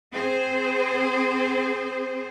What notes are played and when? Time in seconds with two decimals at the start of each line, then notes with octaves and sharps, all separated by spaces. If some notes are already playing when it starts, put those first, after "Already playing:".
0.13 C4 G#4 C5